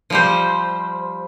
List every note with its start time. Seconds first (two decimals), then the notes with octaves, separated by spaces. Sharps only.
0.10 F3 G3 C5